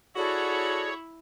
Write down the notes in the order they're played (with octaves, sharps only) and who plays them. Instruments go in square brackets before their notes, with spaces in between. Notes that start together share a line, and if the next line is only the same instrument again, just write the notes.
[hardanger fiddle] E4 [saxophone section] F#4 [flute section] G#4 A4 D5 [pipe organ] C#5